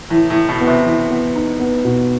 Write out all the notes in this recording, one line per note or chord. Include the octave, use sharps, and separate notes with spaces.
A2 E3
A2
E3
B2
B3
C3
E3
B3
D#4
B3
B2